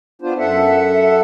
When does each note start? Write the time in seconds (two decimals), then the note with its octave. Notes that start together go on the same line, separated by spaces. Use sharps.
0.22 B3 D4 F4 C5
0.39 F#2 A4 E5 F#5